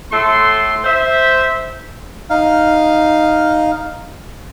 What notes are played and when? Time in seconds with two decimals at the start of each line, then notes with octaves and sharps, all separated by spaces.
0.11 A2 A3 A4 C6
0.84 C5 E5
2.30 D#4 F5